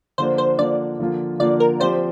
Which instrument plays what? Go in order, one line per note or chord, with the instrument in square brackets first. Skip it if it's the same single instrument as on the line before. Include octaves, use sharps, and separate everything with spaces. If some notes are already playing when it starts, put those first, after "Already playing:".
[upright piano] D3 F3 A#3 D4 [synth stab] C5
[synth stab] C5
[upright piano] D3 F3 A#3 D4 [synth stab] D5
[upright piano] D3 F3 A#3 F4
[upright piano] D3 F3 A#3 F4 [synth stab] D5
[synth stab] A#4
[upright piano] F3 C4 G4 D5 [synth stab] C5